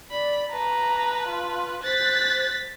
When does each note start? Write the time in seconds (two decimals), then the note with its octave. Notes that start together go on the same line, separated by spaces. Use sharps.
0.11 D5 B5
0.52 B4 A5 A#5
1.28 F4
1.84 C5 F#6 A6 B6